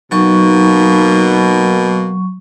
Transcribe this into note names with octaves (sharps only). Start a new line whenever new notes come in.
B2 F#3 A#3 D#4 C#6